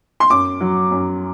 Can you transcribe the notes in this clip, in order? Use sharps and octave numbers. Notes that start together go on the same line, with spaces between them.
C6
F#2 D6
F#3
F#2